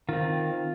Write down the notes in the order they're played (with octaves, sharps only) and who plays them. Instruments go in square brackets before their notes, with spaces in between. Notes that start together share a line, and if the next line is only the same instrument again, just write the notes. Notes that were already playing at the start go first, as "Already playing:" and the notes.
[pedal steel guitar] D#3 C4 F4